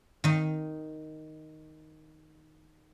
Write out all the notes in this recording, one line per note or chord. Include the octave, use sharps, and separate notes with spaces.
D#3 D#4